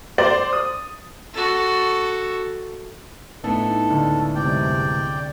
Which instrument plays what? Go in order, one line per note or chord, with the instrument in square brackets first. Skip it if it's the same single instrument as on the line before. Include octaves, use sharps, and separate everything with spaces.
[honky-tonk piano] C5 D5 D6 A6
D#6
[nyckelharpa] F#4 A4
[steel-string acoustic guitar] A2 B3 D4 [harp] D#4 [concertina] A4
[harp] C#2 D3 A3
[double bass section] F#2 C3 G#3 [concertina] D5 G5